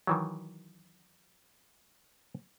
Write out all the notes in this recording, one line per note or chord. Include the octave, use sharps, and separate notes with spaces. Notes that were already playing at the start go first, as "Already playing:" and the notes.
D#3 E3 F#3